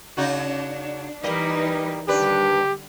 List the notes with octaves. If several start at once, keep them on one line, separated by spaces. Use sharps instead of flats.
C#3 D4 D#4 F#4
E3 G3 A#3 D#4 B4 D#5
D#2 D3 G3 D4 G4 B4